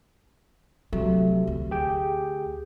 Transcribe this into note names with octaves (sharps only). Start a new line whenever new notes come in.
C3 F#3 A3
D2
G4 G#4 G5